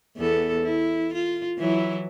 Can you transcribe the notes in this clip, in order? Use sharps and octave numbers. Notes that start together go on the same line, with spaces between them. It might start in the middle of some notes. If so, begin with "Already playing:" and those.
E2 B3 A4
E4
F4
E3 F#3 E4